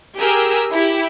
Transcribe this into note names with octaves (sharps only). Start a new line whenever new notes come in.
G4 G#4 A#4 E6
E4 G4